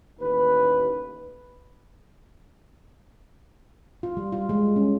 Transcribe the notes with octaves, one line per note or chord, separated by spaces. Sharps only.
A1 D#2 B4
F4
G3
F4
G#3
C#4